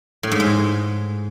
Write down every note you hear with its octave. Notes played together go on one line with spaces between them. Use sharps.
A2
G#2
G#3